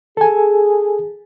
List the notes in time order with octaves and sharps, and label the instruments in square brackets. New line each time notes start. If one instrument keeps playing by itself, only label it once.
[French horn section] G#4 [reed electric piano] A4 G#5